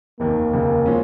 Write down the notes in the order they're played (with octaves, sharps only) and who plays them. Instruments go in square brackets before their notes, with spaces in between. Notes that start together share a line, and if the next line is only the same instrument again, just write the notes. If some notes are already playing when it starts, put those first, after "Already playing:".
[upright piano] F1 D#2 D#3 [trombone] A#3
[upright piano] F1 D#2 C#3
F3 G#3 C#4